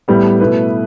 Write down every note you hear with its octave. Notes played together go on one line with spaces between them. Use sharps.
A2 G3 B3
B2 A3 E4 B4